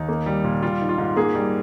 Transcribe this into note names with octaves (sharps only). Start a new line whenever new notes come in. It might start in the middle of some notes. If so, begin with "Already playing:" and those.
Already playing: D#2 D#4
A#3
G3
A#2
G3 F4
D#3
F4
G#2
A#3 G#4
G3